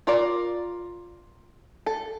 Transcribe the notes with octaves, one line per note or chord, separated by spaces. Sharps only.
F4 A#4 D5
A4